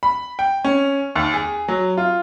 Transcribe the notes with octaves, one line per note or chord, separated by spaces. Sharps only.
B5
G5
C#4
D#2
G#4
F#3
F4